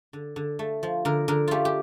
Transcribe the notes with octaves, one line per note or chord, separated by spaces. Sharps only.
D3
D3
A3
F3
D3 A#4
D3 A#4
A3 F4 G4
G4